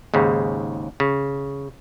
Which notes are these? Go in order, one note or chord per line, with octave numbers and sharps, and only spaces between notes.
D#2 G#2 C#3
C#3